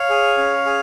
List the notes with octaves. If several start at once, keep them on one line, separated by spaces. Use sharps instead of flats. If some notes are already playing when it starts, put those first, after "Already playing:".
Already playing: C#5 F5
G#4
C#4
G#4